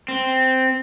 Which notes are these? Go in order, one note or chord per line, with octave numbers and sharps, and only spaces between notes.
C4